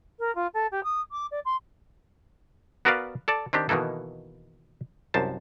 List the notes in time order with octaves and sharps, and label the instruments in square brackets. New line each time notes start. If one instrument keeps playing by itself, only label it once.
[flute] A#4
F4
A4
G4
D#6
D6
D5
C6
[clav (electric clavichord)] B3 F#4 A#4 B4 D5 F5
A4 D5 A5
D#3 C4 D4 G4
B2 D#3 E3 A#3 A4
C2 F#2 C5 A5